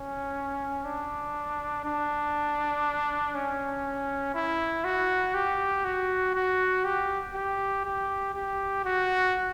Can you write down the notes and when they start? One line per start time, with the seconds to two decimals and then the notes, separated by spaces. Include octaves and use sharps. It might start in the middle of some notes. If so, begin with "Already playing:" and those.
Already playing: C#4
0.85 D4
1.85 D4
3.35 C#4
4.35 E4
4.84 F#4
5.35 G4
5.85 F#4
6.35 F#4
6.85 G4
7.35 G4
7.85 G4
8.35 G4
8.85 F#4